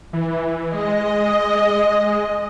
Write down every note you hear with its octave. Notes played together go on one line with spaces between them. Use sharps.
E3
G#3 D#5